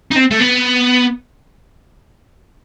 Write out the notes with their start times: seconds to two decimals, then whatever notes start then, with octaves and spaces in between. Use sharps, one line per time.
0.11 D#4
0.16 C4
0.31 A3
0.40 B3